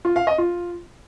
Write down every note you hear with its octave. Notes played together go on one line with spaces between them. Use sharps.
F4
F5
D#5
F4